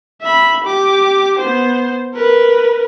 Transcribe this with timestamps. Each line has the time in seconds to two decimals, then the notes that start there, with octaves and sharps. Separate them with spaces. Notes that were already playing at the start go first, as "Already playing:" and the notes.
0.21 E5 B5
0.64 G4 D6
1.39 B3 C5
2.14 A#4 B4